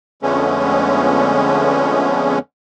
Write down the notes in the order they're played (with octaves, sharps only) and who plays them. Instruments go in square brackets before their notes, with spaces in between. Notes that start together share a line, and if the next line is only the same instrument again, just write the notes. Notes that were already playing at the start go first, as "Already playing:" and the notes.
[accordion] F2 D3 G#3 A3 B3 C#4